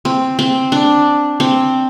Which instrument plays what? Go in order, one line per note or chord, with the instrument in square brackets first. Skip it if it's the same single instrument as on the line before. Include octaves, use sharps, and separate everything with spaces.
[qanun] C4
C4
D4
C4